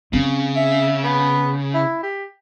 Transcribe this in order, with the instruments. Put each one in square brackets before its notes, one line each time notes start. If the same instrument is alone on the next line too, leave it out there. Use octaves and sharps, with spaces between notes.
[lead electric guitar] C#3 [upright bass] C4 C#4
[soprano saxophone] E5
B3
E4
G4